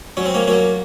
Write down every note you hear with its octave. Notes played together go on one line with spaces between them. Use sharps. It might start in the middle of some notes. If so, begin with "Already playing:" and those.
F#3 C#4
C4
A#3 C#4
F#3 A#3 C#4